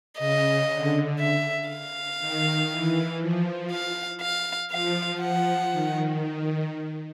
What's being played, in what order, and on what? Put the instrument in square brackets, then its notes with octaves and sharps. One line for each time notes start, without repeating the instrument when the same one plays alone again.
[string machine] C#3 [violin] D#5
[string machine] D3
[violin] E5
F5
[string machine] D#3
E3
F3
[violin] F5
F5
[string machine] F3 [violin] F5
[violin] F#5
[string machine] D#3